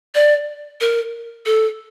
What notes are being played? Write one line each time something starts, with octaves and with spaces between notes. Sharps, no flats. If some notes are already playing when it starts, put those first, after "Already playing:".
D5
A#4
A4